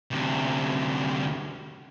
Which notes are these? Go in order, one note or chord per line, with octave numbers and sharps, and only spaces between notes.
D2 C3